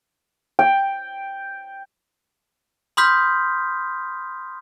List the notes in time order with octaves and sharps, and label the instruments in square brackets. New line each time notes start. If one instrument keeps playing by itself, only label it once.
[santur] G5
[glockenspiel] B5 C6 D#6 F6 G6 B6